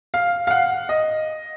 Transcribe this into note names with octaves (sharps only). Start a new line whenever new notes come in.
F5
F5
F#5
D#5